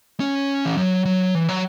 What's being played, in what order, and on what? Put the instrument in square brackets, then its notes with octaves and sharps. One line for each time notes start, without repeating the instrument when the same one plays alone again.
[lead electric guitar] C#4
E3
F#3
F#3
E3
F#3